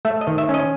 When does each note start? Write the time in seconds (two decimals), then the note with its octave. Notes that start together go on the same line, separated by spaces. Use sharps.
0.05 A3 E5
0.21 D#5
0.27 D#3
0.38 E5
0.49 C#4
0.54 D#5